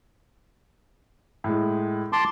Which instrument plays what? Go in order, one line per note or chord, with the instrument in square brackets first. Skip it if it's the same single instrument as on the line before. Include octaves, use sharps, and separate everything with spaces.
[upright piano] A2 G#3
[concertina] A5 C6 D6